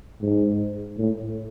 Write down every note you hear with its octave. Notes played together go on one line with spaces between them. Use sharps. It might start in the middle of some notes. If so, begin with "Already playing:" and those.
G#2
A2